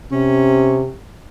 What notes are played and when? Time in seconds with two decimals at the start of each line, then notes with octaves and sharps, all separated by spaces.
0.12 C3 C#4